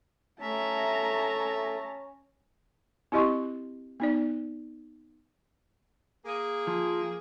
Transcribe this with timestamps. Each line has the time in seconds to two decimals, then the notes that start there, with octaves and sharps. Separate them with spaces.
0.41 A3 C#4 E5 A5 A#5
3.12 C4 E4 G4 D#5 C6 C#6
4.00 B3 D#4 D5
6.25 A#3 G#4
6.67 F3